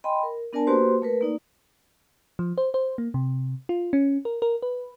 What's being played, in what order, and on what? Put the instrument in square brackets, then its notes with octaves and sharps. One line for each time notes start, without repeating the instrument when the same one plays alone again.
[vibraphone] D#5 G5 G#5 B5 C6
A#4
B3 D4 A#4 D5 G#5 A5
A#3 F#4 G4 B4 C5 C6
A3 A#4 B4
A#3 D#4 D5
[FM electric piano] F3
C5
C5
A#3
C3
F4
C#4
A#4
A#4
B4